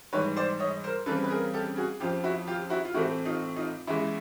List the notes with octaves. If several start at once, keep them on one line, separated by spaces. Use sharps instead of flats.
G#2 E3 G3 B4 C#5
C5 D5
C#5 D#5
A#4 C5
C#3 E3 G3 C4 A4 B4
B4
G#4 A#4
G4 A4
F#4 G#4
F2 C#3 F3 F4 G4
E4 F#4
F4 G4
E4 F#4
F4
A2 E3 A3 C4 E4 F#4
D#4 F4
D#4 F4
E2 C#3 E3 G#3 E4